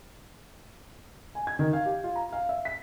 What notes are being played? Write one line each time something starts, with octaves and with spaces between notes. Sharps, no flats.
G#5
G#6
D#3
F5
G4
F4
A#5
F5
E5
B6